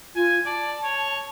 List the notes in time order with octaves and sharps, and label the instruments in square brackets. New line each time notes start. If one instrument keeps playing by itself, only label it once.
[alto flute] F4 [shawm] G#5
[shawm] D5 [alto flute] A5
[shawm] C#5